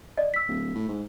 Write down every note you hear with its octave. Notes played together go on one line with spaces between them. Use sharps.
D5 D#5
E6 B6
D1
A2
G#2